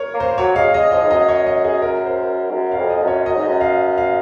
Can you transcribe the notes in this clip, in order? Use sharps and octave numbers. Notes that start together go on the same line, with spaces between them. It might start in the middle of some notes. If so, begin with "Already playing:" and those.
Already playing: A#4 C#5
A#3
C5
F#3 C#5
G#3 F5
G#3 D#5
F3 D#5
G#2
F#2 D#5
C#5
D#5
G#4
A#4
C5
G#2
F#2
F5
F2
D#5
F#2
C#5
F#2 D#5
G#2
F#2
F5
F5